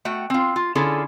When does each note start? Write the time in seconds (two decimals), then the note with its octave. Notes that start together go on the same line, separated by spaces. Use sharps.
0.05 A3 F#4 G5
0.30 C4 F4
0.56 F4
0.75 D3 C#4 E4 F4 G#4 A4